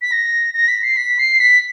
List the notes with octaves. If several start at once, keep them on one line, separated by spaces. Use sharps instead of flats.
B6
A#6
A#6
B6
C7
B6
C7
B6